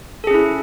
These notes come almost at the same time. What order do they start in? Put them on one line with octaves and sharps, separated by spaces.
A4 G#4 C#4 E4